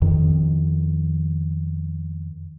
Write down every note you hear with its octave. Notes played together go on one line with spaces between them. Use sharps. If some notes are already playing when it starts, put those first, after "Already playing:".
F2 D#3